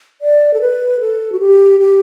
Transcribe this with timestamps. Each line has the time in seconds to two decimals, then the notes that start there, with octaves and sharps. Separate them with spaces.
0.22 D5
0.54 A4
0.61 B4
1.00 A4
1.32 F#4
1.40 G4
1.80 G4